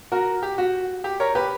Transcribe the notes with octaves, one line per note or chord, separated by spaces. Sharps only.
F#4 A#4
G4
F#4
G4
A#4 C#5
G4 B4